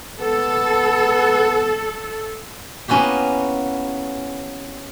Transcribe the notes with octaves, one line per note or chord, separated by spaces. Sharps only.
B3 A4
A#3 B3 C#4 E4 F#4 G4